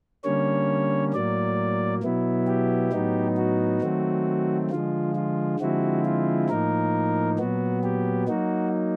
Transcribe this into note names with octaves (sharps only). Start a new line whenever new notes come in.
D3 G3 A#3 C#4 C#5
A2 F#3 A#3 D5
B2 F#3 B3 E4
G4
A2 F#3 B3 D#4
F#4
D#3 F#3 A3 C4
D3 F3 G#3 F4
F4
D3 F3 G#3 C4 E4 F#4
F4
A2 F3 A#3 D#4 A#4
A#2 F#3 B3 F#4
G4
F#3 A#3 D#4 F#4